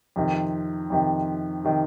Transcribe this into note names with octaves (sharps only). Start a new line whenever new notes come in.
F2 C3 D#3
F2 C3 D#3
C3 D#3